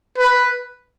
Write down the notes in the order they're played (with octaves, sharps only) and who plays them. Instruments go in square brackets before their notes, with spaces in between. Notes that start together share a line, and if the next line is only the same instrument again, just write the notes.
[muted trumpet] B4